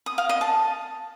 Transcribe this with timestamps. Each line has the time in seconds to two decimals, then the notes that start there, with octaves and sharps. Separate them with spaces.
0.06 D#6
0.18 F5
0.29 D#5
0.41 A5